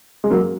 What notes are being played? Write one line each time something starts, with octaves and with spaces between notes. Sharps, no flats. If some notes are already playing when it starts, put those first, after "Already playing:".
G#3
F#3 A#3